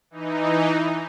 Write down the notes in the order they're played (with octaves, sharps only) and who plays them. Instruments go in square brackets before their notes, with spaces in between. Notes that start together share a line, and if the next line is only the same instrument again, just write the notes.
[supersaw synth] E3 D#4